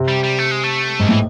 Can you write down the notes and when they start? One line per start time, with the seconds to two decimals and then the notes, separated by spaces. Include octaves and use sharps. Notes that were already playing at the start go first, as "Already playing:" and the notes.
Already playing: C3
0.08 G3
0.24 G3
0.39 A3
0.51 G#3
0.63 A3
0.99 G#2 D#3
1.09 A2 E3